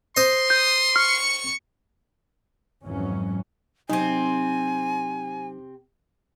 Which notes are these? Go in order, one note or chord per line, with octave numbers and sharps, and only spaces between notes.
C5 D#5 C6
D#6 G6
C#6 F6 C#7
G#1 F2 G#2 E3 F#3 C#4
C3 F#3 C4 D#4 G#5